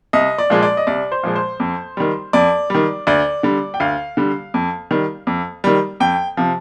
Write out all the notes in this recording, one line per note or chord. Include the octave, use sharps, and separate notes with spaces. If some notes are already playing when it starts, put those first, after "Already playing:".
C2 D#5
D5
A#2 F3 G#3
D5
D#5
C2 D5
C5
A#2 F3 G#3
C5
F2
D#3 G3
F2 D5
D#3 G3
D2 D5
D3 G3
G5
D2 F5
D3 G3
F2
D#3 G3
F2
D#3 G3
F2 G5
C3 F3